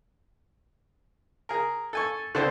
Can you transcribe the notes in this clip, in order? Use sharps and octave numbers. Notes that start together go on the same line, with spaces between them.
G#4 A#4
A4 G#5 C#6
D3 B3 C4 A4 C5